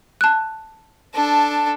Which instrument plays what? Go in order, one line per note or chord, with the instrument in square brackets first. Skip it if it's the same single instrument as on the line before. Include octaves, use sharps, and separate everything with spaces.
[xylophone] A5 F#6
[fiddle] D4 A4